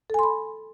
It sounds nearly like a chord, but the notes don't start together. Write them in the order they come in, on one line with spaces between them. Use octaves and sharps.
A4 G#5 C6 B5